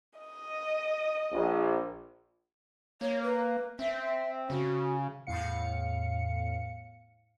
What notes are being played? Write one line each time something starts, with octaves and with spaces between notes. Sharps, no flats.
D#5
A#1
A#3 C#5
B4
C4 E5
C#3 F#4
E2 A2 F5 C#7